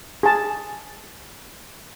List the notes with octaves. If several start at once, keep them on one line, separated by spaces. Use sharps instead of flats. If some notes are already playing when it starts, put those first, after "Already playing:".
G#4 A5